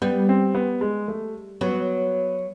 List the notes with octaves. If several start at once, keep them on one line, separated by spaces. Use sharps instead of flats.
G3 B3
C4
B3
G#3
A3
F#3 B3